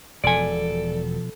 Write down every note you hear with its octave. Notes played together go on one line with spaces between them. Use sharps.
E1 B2 F3 A4 D5 G#5